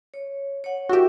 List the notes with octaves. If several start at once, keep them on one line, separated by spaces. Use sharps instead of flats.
C#5
C#5 F#5
E4 F#4 G4 A#4 E5